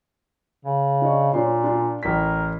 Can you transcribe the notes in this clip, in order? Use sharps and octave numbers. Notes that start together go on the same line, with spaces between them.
C#3
D4 D#5 C#6
A#2 D4 C#5 C6
D4 C6
A1 A#4 B6